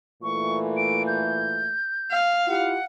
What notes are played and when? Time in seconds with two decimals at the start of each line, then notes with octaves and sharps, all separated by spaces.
0.23 A#2 E3 A3 C#6
0.77 D7
1.07 G6
2.12 F5
2.47 E4 F4 G4 F#5